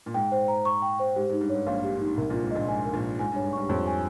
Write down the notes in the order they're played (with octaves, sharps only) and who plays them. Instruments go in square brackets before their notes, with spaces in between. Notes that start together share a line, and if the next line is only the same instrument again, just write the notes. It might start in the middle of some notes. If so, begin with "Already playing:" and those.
[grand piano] A#2
[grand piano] G#2 [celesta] G5
[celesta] C5
A#5
C#6
G5
C5
[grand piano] G#2 [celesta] G4
[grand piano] G#2
[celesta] D#4
[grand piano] G2
[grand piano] G#2 [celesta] C#5
[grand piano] A#1 A#2 [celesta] F5
[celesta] G4
D#4
[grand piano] C2 C3 [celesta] A#4
[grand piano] A#1 A#2
[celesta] F4
[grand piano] G#2
[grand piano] A#1 A#2 [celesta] D#5
[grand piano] G#2 [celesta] G#5
[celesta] A#4
[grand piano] A#1 A#2
[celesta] F4
[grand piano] G#2 [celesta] G#5
[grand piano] G2
[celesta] C#5
[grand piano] G#2
[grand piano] G2 G3 [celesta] C#6
[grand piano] F2 F3 [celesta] C#5
[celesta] G#5